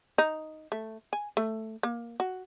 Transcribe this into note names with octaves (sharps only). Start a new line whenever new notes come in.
D#4
A3
G#5
A3
A#3
F#4